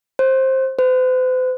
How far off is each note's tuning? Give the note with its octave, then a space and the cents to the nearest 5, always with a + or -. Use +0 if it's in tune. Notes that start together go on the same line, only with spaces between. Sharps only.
C5 +15
C5 -45